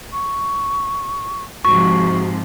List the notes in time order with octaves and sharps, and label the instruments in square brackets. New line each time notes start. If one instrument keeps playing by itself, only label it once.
[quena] C#6
[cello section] G#2 C3 F3 [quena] F#4 [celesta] C#6